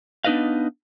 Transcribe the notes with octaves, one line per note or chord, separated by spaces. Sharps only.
B3 D4 D#4 B4 D#5 F5